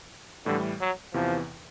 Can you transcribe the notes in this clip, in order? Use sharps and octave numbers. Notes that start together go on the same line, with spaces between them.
A2 D3 E3 G3
F#3
E2 C3 E3 F3